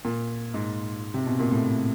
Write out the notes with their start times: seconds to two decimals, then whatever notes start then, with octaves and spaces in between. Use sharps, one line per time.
0.05 A#2
0.54 G#2
1.14 C3
1.27 B2
1.40 A#2
1.51 A2